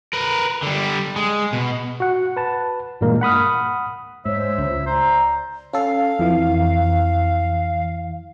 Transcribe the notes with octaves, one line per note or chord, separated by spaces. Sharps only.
A#4 B4
D3 G3
G#3
B2
F#4 F#5
B4 A5
G2 A#2 E3 G#3 A#3 A#4
F#5 B5 D#6 F6
G#2 C5 C#5 E5
C#2
C5 D5 A#5
C#4 A4 F5
F2 E3